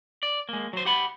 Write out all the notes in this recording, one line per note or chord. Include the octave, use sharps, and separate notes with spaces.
D5
G#3 A#3
F#3 C5
G4 F#5 B5